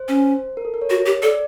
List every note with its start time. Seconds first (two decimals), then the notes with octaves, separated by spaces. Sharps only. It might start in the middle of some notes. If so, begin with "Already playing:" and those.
Already playing: C5
0.08 C#4
0.57 A#4
0.65 A4
0.74 A#4
0.82 C#5
0.90 F#4
1.06 G4
1.23 A4 D5